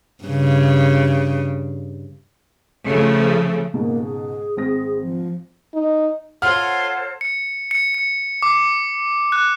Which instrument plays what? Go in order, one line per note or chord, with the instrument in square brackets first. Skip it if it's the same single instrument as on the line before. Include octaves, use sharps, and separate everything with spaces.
[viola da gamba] G2 C#3
[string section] C#3 F3 A3
[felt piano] C#2 G#2 B2 [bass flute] A#3
[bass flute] G#4
[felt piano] G#1 C4 A#6
[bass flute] F3
[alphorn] D#4
[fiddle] F4 [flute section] A4 C5 C#5 [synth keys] F#5 [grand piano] F6
[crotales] C#7
C#7
C#7
D6
F#6